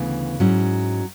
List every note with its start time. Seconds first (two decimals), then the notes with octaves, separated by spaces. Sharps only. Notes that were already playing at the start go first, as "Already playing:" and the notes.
Already playing: D2 C#3 E3 B3
0.40 G#2 F#3 C#4 E4